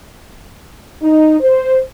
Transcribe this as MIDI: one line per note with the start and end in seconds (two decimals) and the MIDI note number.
1.03 1.40 63
1.40 1.79 72